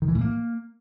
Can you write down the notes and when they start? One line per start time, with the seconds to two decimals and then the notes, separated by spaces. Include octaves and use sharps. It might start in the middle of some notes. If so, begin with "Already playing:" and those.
0.02 D#3
0.08 E3
0.15 A2
0.21 A#3